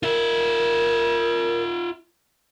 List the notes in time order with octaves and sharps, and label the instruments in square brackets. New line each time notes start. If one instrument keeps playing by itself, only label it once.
[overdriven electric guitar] F4 E5 [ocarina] A#4